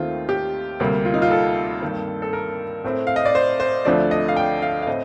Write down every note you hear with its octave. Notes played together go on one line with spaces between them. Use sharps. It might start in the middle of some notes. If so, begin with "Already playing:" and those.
Already playing: D#2 D#3 A3 C4 F4
G4
D2 C3 G3 A#3
F4
D#4
F4
A4
G2 D#3 A#3
A4
A#4
A2 A3 C4
F5
D#5
D5
C5
C5
D2 D3 F3 A3 C4 D5
D#5
F5
G5
F5
F5
A2 A3 C4 D#5